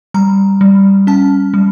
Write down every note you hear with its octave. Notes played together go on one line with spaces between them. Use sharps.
G3 A#5
G3
C#4 A5
G3